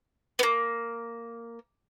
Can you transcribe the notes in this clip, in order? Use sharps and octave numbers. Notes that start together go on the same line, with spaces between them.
A#3 B3